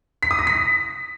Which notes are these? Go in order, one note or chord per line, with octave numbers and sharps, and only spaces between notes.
B6
D#6
A#6
B6